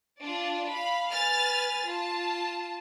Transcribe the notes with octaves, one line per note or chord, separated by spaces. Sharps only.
D4 F4 D5
F5 B5
B4 G#5 F6 A6
F4 A5